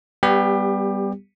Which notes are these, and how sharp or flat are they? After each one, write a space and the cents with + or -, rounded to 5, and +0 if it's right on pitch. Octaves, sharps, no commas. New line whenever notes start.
G3 +0 B3 +5 G4 +25